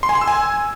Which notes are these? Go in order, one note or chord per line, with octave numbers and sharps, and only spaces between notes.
C6
G#5
C6
E6
G#5